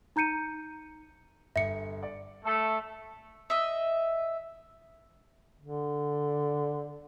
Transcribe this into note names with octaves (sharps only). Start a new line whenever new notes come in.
D#4 A#5 G6 C#7 D#7
G1 E5 C#7
D5
A3 A4
D#5 E5
D3